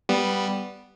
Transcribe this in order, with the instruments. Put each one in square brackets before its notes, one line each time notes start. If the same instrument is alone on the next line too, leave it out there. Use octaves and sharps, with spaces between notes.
[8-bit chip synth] G3 B3